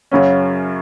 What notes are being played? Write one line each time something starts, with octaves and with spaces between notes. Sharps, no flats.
F#2 C#3 F#3 C#4